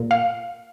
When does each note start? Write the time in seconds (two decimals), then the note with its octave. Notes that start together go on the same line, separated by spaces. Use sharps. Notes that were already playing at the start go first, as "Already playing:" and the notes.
Already playing: A#2
0.11 F5